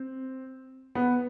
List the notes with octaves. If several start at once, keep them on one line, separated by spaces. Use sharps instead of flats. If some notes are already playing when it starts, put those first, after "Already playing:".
Already playing: C4
B3